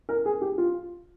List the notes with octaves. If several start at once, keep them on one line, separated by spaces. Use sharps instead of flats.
A#4
G#4
G4
F4